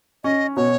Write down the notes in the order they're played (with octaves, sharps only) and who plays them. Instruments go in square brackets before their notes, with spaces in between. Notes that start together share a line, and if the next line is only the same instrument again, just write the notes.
[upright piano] C#4 [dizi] D#5
[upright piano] B2 [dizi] C#5